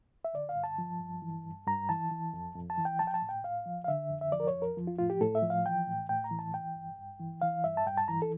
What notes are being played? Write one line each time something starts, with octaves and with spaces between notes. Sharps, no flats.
E5
D3 D5
F5
G2
A5
F3
G2
E3
G2
G2 A#5
E3 A5
E3
F2
F2
A5
E3
G5
F3 A5
G5
A5
A2
G5
A2 F5
F3
F5
D3 E5
F2
E5
F3 D5
A#4
C#5
F2
A#4
F3
F4
A2 F4
G4
A2 A4
E5
F3
F5
E3 G5
A2
A2 G5
A#5
E3
A5
E3 G5
G2
G2
E3
E3 F5
G2 E5
A5
G2 G5
A5
E3 A#5
A4